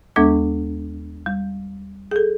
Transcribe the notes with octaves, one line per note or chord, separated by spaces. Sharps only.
D#2 G#3 B3 D4 A4 D6
G3
G#4 A4